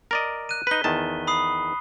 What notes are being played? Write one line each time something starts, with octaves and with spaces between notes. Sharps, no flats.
A#4 D5 D#5
F#6 D#7
D#4 B4 B6 G7
E2 D#3 A5
B5 D#6 C7